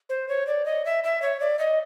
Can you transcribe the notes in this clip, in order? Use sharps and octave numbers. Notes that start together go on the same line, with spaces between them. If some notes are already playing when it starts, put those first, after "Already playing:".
C5
C#5
D5
D#5
E5
E5
C#5
D5
D#5